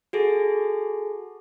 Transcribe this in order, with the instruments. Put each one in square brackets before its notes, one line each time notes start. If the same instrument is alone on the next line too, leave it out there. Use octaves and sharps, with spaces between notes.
[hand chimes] F#4 G#4 A4